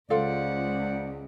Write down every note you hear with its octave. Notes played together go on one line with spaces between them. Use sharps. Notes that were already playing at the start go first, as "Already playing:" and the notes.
C#2 F4 A4 C5 D5 F5 F#5